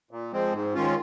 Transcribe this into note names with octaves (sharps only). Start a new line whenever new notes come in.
A#2
F3 G#3 C4
G#2
D#3 G#3 C#4 F4